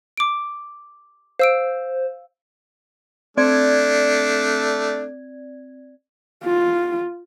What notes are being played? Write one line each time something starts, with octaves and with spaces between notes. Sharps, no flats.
D6 D7
C5 F5 E6 D7
A3 C4 D4 D5 G#6
F4